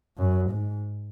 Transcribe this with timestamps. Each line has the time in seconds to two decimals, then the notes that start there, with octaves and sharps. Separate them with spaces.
0.18 F#2
0.50 G#2